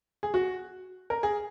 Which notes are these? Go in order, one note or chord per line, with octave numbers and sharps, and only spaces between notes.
G#4
F#4
A#4
G#4